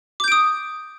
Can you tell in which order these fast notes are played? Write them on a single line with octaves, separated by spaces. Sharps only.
D6 G6 D7 D#6